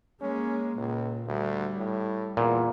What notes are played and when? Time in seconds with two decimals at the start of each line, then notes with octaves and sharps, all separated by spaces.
0.21 G#3 A#3 C#4
0.77 C#2 A#2
1.27 D2 G3
1.77 A2
2.37 E2 A#2